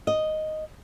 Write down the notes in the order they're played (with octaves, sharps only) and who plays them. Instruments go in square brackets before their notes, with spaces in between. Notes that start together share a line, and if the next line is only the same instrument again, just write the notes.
[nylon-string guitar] D#5